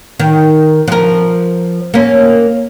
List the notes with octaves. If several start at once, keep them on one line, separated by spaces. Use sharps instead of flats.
D#3
F3 A#4
A#3 C#4